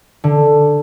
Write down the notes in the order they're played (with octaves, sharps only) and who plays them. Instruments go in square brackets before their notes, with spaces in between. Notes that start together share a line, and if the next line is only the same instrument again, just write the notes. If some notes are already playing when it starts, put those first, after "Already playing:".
[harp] D3